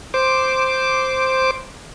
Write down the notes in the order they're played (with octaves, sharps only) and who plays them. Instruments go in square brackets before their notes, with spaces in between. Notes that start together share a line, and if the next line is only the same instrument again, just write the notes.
[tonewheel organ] C5 D6